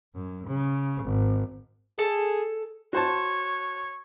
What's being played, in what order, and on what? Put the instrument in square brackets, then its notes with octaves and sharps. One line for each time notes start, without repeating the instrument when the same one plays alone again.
[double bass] F#2
C#3
G#1
[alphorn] G#4 [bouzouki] A4 A5
[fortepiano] F#4 C5 A5 [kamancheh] C#5